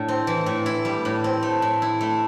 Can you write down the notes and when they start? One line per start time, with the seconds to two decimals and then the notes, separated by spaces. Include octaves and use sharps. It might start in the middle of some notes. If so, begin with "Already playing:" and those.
Already playing: A2 D4 A4
0.08 C4
0.27 E3
0.46 A2
0.66 E4
0.85 G3
1.05 A2
1.24 C4
1.43 A3
1.62 A2
1.82 E4
2.01 A3